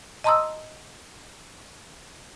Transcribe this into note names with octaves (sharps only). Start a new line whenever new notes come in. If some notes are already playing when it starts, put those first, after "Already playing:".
D#5 A5 A#5 C6 D#6 E6